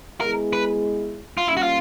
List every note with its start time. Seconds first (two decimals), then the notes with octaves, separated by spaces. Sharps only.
0.21 G#3 B3 E4 G#4 A#4
0.53 B4
1.37 F4
1.46 G3 A#3 C#4 E4
1.57 F#4
1.63 F4